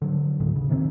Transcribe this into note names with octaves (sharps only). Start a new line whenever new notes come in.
D3 F#3
D1 A1 D#2 D3
C#3
C3 D#3 A3 C4